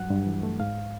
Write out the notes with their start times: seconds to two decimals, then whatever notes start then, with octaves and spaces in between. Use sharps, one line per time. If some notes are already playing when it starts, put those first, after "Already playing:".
Already playing: G2 F#3 F#5
0.11 G2
0.27 E3
0.43 A3
0.60 G#2 F5